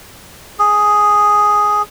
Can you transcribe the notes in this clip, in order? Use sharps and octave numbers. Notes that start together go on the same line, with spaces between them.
G#4